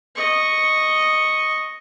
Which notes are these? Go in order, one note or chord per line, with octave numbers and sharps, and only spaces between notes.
D#5 C#6